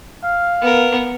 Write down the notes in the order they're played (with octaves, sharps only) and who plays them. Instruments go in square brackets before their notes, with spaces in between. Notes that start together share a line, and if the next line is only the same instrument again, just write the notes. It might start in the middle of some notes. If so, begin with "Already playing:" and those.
[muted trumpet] F5
[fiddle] B3 A#4